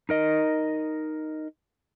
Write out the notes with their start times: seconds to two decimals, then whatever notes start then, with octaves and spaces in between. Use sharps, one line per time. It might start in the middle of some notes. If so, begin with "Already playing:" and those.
0.09 D#4 A#4 D#5